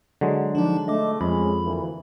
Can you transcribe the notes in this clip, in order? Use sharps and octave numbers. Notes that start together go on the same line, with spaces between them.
D3 F#3 G#3
F3 D4 D#4
A3 D#5 D6
F2 G#3 C#4 B5
D2 E3 A#3